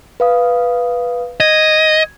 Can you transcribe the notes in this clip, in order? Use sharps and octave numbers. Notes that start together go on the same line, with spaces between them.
B4 F5 D#6
D#5 G#6